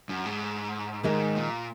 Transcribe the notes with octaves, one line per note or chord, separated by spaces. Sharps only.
F#2
G#2
G#2 D#3 G#3 D#4
A#2